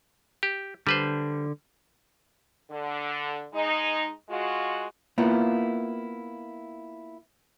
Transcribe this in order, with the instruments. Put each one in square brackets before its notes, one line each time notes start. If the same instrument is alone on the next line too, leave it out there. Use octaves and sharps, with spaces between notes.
[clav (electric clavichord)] G4
[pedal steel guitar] D3 [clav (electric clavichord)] G3 B4 C5
[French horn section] D3
G#3 D#4
G#3 F4 F#4
[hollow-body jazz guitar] A#3 B3 E4 F4